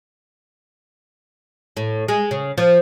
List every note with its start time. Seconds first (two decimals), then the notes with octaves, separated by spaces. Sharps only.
1.77 A2
2.08 G#3
2.31 C#3
2.58 F3